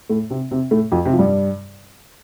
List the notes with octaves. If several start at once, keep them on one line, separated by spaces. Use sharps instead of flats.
A2 A3
C3 C4
C3 C4
A2 A3
F2 F3
C3 C4
F3
G2 G3